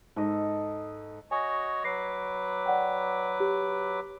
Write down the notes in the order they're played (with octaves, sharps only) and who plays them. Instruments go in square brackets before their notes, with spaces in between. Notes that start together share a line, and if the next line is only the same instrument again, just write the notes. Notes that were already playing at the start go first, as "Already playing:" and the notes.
[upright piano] G#2 [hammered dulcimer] A4 D#5
[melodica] F#4 C#5 D#5 [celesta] G#5
[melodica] F#3 B4 D6 [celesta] A#6 C7
[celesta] D5 F#5 G5
G4